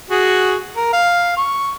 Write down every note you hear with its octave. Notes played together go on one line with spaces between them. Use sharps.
F#4 G#4
A#4
F5
C#6